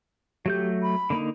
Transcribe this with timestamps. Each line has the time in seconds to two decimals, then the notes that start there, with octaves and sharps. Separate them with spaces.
0.46 F#3 A3 G4 G6
0.83 B5
1.10 D3 A#3 D#4